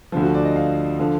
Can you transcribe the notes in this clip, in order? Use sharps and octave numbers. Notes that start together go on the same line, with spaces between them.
D2 D3 F3
F#4
D5
D#5
F5
D3 F3